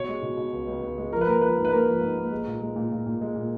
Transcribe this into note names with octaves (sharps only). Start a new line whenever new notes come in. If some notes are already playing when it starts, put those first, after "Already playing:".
Already playing: B2 C#5
G#3
B2
B2
C#2
C#2
C#2
G#3
F3 A#4
B4
A#3 A#4
F3 B4
G#2
B4
A#3 A#4
F3
G#2
A#3
G#3
A#2
G#3
A#2
A#2
A#2
G#3
A#2